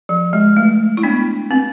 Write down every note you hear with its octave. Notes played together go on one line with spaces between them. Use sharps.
F3
G#3
A3
E4
B3 D4
C4